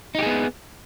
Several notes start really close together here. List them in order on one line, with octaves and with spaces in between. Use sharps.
D#4 G4 G#4 B3